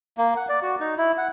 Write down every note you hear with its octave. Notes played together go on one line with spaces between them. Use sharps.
A#3
F#5
D5
F#4
D#4
E4
F#5